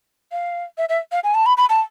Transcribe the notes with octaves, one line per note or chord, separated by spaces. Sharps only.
F5
E5
E5
F5
G#5
A5
B5
B5
A5